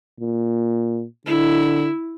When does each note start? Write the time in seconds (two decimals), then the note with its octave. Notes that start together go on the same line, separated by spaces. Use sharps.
0.20 A#2
1.27 D3 E4